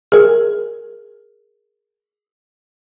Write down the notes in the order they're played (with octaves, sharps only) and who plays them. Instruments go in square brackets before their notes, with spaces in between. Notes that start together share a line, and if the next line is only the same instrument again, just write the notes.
[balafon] G#4 A#4